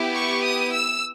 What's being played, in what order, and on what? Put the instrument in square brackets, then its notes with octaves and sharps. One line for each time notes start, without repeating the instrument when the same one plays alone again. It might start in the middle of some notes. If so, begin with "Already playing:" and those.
Already playing: [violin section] B3 E4 G4
C#6
D#6
E6